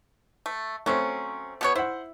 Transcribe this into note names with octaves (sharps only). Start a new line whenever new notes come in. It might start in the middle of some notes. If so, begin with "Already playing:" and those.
A3
F#3 A3 C4 C#4
B2 B3 C#5
E4 C5 F#5